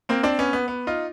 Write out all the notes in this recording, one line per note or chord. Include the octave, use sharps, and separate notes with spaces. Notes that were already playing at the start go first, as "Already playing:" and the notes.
A#3 C4
C4 D4
B3 C#4
B3
B3
D#4 F4